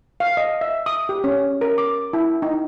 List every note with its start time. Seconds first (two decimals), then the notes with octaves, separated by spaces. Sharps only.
0.20 F5
0.37 D#5
0.61 E5
0.86 D#6
1.09 G4
1.24 C#4
1.61 A#4
1.78 D6
2.13 E4
2.42 D#4